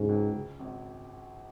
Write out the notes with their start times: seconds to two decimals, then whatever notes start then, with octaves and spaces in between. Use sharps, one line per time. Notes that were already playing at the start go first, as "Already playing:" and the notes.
Already playing: G#2 C#3 F#3 C#4
0.09 C#2
0.34 C#3
0.60 G#1